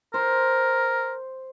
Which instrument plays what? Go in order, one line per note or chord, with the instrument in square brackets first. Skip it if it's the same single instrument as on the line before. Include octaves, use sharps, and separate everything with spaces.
[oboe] A#4 [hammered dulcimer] C5